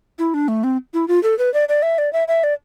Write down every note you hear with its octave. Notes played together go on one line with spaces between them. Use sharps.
E4
D4
A3
C4
E4
F4
A4
B4
D5
D5
E5
D5
E5
E5
D5